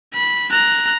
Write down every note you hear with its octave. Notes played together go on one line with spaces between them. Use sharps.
B5
A#5 F#6